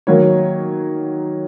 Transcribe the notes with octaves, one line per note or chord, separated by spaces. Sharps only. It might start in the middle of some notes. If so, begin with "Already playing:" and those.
D#3 F#3 A#3 C#5